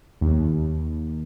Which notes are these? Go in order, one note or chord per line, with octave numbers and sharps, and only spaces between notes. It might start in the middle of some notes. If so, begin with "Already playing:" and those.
D#2